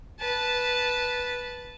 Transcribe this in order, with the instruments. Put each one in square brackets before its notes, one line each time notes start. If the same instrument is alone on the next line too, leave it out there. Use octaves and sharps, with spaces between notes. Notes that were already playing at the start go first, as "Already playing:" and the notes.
[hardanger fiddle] B4 A5